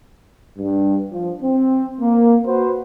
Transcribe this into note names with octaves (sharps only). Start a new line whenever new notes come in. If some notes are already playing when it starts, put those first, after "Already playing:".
G2
F3
C4
A#3
F#4 B4 C5